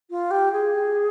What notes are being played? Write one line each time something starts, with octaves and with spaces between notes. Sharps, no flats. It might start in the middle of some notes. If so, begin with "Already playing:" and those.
F4
G4
G#4